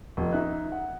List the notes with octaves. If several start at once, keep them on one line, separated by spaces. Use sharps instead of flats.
F1
D#4 E5 F#6
F#5